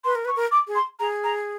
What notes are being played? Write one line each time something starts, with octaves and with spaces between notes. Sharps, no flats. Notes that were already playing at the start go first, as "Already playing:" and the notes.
B4 C6
A#4
B4
C#6
A#4
D6
G#4
C6
G#4 A#5
A#5